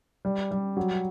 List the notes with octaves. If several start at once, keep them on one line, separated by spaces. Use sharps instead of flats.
G3
G3
F#3